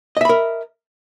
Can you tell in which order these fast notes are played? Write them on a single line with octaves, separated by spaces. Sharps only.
D#5 E5 B5 A#4